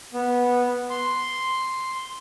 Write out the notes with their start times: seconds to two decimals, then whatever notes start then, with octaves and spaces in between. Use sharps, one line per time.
0.14 B3
0.90 C6